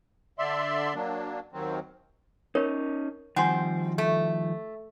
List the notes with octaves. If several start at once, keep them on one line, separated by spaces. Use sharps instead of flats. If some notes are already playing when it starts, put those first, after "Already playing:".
D3 D5 E5 C6
F#3 A#3 D4
D#2 D#3 F#3 C4
C#4 D#4 A#4 C#5
D#3 F3 G3 C4 F#5 G#5 C6
A3